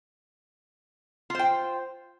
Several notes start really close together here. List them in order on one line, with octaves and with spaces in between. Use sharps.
F4 C5 G5